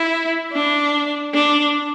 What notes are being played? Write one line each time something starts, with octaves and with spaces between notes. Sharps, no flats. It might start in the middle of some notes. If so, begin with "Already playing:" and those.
Already playing: E4
D4
D4